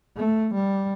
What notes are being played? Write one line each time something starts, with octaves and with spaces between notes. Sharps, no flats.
A3
G3